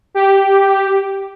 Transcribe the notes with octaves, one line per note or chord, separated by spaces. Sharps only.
G4